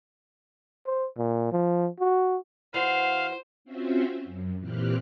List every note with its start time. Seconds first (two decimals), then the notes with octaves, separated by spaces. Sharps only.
0.86 C5
1.18 A#2
1.52 F3
2.00 F#4
2.74 E3 F#4 C5 F5
3.65 C4 C#4 F4 F#4 C5 E5
4.24 F#2
4.59 A#2 E3 C4 G4 F6 F#6